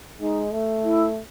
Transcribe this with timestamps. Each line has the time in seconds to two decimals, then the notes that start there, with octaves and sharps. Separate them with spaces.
0.20 G#3 D#4
0.53 A3
0.84 E4